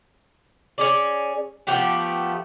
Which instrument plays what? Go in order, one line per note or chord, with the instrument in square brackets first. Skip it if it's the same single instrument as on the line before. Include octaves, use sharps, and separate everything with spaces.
[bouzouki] C#4 G#4 D5
F3 A3 B3 G4